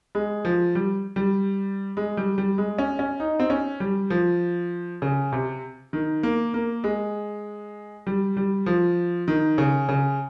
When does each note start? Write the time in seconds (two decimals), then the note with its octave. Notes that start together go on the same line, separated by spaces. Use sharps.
0.15 G#3
0.45 F3
0.75 G3
1.16 G3
1.97 G#3
2.17 G3
2.38 G3
2.58 G#3
2.78 C#4
2.99 C#4
3.20 D#4
3.40 C4
3.50 C#4
3.80 G3
4.10 F3
5.02 C#3
5.33 C3
5.93 D#3
6.23 A#3
6.54 A#3
6.84 G#3
8.07 G3
8.37 G3
8.66 F3
9.28 D#3
9.58 C#3
9.89 C#3